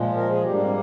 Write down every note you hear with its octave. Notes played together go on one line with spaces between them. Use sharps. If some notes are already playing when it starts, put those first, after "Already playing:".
Already playing: A#2 F3 G#3
A#4
G#4
G#2 G3 A#3 G4
D4
C4